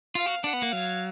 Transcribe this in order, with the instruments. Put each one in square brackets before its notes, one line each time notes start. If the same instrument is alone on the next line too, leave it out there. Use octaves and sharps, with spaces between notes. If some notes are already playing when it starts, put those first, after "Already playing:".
[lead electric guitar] F4 [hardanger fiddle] F5
[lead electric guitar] F#4
[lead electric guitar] D4 [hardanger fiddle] F#5
[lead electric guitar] B3
A#3
[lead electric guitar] F#3 [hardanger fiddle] F5